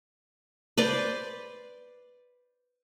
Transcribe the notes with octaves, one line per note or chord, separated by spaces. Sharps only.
B4 C5 D5